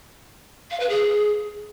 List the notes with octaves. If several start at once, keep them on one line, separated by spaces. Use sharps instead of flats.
F5
B4
G#4